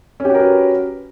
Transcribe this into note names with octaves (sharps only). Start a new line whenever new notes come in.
C#4 F#4 G4 A#4 B4